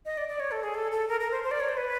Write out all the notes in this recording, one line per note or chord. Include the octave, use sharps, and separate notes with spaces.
D#5
D5
D5
C#5
A4
G#4
A4
A4
A#4
A#4
C5
C5
D5
C#5
C5
B4